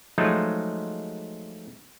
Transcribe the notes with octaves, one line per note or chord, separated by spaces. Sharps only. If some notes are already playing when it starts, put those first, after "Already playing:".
F3 F#3 G#3 A3 D#4 F4